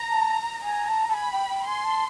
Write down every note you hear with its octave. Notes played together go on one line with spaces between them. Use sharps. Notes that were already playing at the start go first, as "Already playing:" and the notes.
Already playing: A#5
A5
G#5 A#5
A5
A5
G#5 B5
G5
G5
G#5 C6
A5